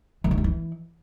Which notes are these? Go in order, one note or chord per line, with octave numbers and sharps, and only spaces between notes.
D#3
D3
G3
E3